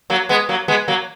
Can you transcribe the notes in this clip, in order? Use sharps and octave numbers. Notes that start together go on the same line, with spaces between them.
F#3 A#3
G#3 B3
F#3 A#3
G#3 B3
F#3 A#3